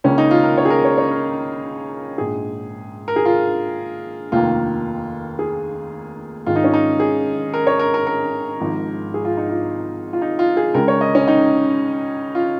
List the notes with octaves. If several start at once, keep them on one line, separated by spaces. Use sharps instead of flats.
C#2 C#3 A#3 C#4
D#4
F4
A#4
C#5
G#4
A#4
C#5
C#5
A#4
A#1 G#2 G#3 G#4
A#4
G#4
F4
F1 D#2 D#3 A#3 F4
G#4
G#1 G#2 D#3 G#3 F4
D#4
C#4
D#4
G#4
A#4
C#5
A#4
A#4
A#4
G#1 G#2 F3
G#4
F4
D#4
F4
F4
D#4
F4
G#4
C#2 C#3 G#3 A#4
C#5
D#5
C#4
D#4
F4